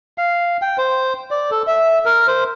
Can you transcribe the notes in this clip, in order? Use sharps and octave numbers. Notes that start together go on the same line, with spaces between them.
F5
G5
C5
D5
A4
E5
A#4
C5